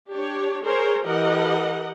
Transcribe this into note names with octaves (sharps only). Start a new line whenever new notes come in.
D4 G4 C#5
G#4 A#4 C5 C#5
E3 G4 A#4 D#5 F#5